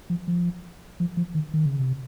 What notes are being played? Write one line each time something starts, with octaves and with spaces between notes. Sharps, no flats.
F3
F3
F3
F3
D#3
D#3
C#3
C3